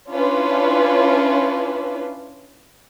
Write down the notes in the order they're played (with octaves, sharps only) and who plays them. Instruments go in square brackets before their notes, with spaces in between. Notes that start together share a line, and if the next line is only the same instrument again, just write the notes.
[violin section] C#4 D4 E4 F4 B4